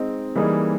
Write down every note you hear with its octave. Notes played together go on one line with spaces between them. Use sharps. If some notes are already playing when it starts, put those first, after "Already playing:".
Already playing: G#3 C4 D#4
E3 G3 A#3 D#4 G#4